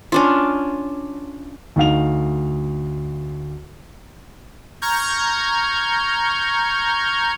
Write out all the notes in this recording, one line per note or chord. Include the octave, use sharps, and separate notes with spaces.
C#4 D4 F4
D2 D#4 F5 F7
A#5 C#6 F6 G6 G#6